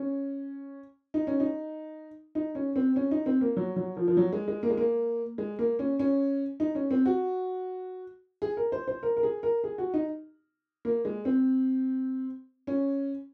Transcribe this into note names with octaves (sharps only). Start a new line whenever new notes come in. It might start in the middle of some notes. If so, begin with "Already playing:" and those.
Already playing: C#4
D#4
C#4
D#4
D#4
C#4
C4
C#4
D#4
C4
A#3
F#3
F#3
F3
F3
F#3
G#3
G#3
A#3
G#3
A#3
G#3
A#3
C#4
C#4
D#4
C#4
C4
F#4
G#4
A#4
C5
C5
A#4
A#4
G#4
A#4
G#4
F#4
D#4
A#3
G#3
C4
C#4